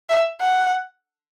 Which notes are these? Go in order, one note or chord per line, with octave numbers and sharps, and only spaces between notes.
E5
F#5